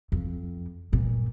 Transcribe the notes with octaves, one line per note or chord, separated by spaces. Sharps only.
F2
G2 A#2